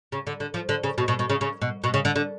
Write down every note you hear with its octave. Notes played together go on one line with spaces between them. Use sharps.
C#3
D3
D3
F3
D3
C#3
B2
B2
B2
C#3
C#3
B2
B2
C#3
D3
D3